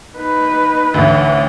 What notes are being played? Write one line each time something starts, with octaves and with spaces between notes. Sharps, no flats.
D#4 B4
A1 D2